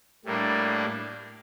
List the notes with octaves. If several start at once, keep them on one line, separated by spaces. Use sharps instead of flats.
A2 G3 A#3 D4